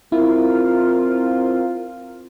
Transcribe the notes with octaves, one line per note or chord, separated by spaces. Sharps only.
C4 E4 F4 A#4